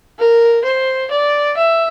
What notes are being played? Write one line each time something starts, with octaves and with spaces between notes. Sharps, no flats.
A#4
C5
D5
E5